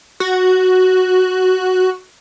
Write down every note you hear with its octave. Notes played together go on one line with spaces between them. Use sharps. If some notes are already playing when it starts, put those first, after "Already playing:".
F#4